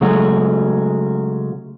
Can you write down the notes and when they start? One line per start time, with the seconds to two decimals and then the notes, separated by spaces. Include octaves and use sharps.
0.01 C#3 F#3 G#3 A3 C#4 F#4